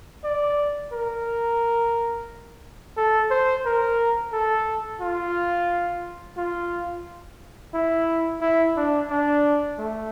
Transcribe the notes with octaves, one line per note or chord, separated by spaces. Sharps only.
D5
A#4
A4
C5
A#4
A4
F4
F4
E4
E4
D4
D4
A3